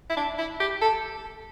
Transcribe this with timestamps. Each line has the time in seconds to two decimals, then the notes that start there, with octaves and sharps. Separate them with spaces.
0.10 E4
0.17 D4
0.38 E4
0.60 G4
0.82 A4